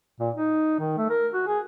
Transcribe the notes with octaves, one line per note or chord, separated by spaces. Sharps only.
A#2
D#4
D#3
A3
A#4
F#4
G#4